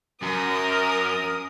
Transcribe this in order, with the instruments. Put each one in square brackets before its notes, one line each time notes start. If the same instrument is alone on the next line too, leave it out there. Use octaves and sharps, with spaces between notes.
[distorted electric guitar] F#2 [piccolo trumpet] A#4 [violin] D#6